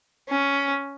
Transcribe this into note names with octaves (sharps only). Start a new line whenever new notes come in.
C#4